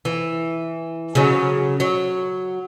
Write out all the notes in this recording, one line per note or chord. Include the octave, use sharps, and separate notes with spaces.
E3
C#3 F#3
F#3